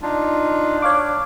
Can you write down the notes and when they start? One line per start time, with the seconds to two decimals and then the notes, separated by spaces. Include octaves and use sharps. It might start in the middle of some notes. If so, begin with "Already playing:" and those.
0.02 D4 D#4 F4
0.82 C#5 F5 D6